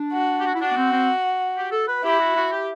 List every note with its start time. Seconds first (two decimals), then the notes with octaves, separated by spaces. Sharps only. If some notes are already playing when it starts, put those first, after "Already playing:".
Already playing: D4
0.13 F#4
0.40 G4
0.46 F#4
0.54 E4
0.60 D4 F#4
0.71 B3
0.77 C4
0.92 C4
1.57 G4
1.72 A4
1.88 B4
2.04 E4 G4
2.20 F#4
2.36 F#4
2.52 G4